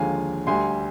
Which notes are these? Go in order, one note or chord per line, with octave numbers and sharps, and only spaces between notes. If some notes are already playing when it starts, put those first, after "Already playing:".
Already playing: D#2 D3 F3 G#3 F5 G#5
D2 D3 G3 G#5 C6